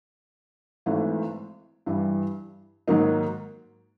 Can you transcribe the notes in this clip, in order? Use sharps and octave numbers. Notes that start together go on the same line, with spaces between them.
G#1 G#2 E3 A3
G2 E3 G3
G#2 D#3 F#3 A#3 D#4